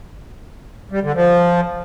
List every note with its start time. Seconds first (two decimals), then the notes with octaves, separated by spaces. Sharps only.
0.91 G3
1.03 D3
1.15 F3